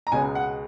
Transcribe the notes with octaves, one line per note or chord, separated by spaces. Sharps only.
A#5
C#2 B2 G#3 C#4 G#5
F#5